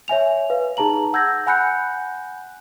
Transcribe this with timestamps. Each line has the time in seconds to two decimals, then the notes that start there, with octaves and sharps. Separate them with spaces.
0.08 C#5 E5 G#5 F7
0.50 B4 F5
0.77 D#4 G#4 A5 A#5 F#7
1.13 F#5 E6 G6 G#6 A#6
1.46 F#5 G#5 B5 F#6 G6 C#7